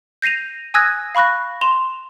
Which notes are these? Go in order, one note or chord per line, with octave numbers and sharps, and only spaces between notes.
G6 A#6 C7 D#7 F7
G#5 D#6 E6 F#6 G#6 A#6
F5 B5 C#6 F#6 A#6
C6 E7 F7